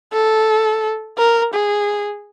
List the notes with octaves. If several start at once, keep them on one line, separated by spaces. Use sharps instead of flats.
A4
A#4
G#4